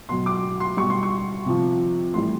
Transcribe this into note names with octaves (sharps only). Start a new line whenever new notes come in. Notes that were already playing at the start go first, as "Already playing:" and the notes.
B2 F#3 C6
D6
C6
B2 G3 C#6
C6
C#6
C3 F3
A2 E3 G3 C6